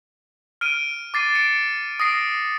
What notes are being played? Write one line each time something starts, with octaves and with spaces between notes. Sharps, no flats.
F6 D7 D#7
D6 A6 C7 D#7
C#7 D7
D#6 A#6 C7 D7